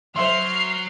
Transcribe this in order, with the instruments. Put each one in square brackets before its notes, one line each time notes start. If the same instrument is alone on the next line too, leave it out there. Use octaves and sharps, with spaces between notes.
[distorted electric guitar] F#3 [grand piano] C5 E5 C6 [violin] F6 C7